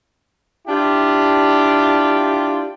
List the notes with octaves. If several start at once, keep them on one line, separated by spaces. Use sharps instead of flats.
D4 E4 F4 G4